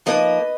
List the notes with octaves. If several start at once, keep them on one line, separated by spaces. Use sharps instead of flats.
F3 A#3 D#4 B4 D#5